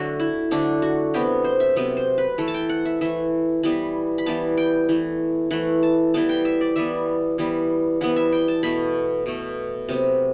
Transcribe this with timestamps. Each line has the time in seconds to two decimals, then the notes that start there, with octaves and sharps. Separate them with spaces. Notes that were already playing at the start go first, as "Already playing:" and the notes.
Already playing: D3 F#3 A3 F#4
0.20 E4
0.51 D3 F#3 A3 D4
0.82 F#4
1.14 C3 F#3 B3 G4
1.44 C5
1.60 E5
1.76 C3 F#3 B3
1.97 C5
2.18 B4
2.38 E3 A3 A4
2.48 A5
2.54 G5
2.69 F#5
2.86 E5
3.01 E3 A3 E5
3.63 E3 G3 B3 B5
4.18 B5
4.26 E3 G3 B3 A5
4.58 G5
4.89 E3 A3
5.51 E3 A3 F#5
5.83 A5
6.14 E3 G3 B3 A5
6.29 G5
6.45 E5
6.61 D5
6.76 E3 G3 B3 E5
7.38 E3 G3 B3
8.01 E3 G3 B3 F#5
8.16 E5
8.32 G5
8.48 A5
8.63 B2 A3 B5
9.26 B2 A3
9.89 C3 F#3 B3